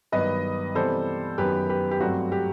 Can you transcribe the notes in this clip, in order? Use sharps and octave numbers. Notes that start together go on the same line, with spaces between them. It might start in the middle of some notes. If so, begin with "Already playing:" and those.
G2 D#3 F#3 B3 B4 D#5
C3 E3 G3 B3 A4 C5
F#2 D#3 F#3 B3 G4 B4
G4 B4
G4
G2 F#3 A3 C4 F#4
G4